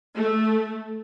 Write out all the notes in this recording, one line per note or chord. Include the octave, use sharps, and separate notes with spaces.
A3